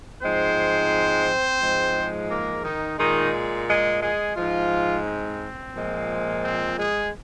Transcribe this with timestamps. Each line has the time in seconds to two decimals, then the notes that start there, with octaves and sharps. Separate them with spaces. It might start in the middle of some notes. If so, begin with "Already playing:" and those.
0.23 G#2 F3 G#3 C4 C5
1.61 G#2 F3 G#3
2.30 A#3 A#4
2.64 D#3 D#4
2.99 A#2 D#3 G#3 D#4
3.69 G#3 G#4
4.02 G#3 G#4
4.37 G#2 F3 G#3 F4
5.07 C4
5.75 A#2 F3 G#3
6.44 C4
6.78 G#3 G#4